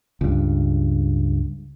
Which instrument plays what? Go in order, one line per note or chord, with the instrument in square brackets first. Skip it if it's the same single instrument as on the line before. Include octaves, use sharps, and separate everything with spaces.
[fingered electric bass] C#2 G2